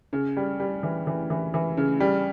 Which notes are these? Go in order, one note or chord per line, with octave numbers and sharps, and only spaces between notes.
C#3
G3
G3
E3
E3
E3
E3
C#3
G3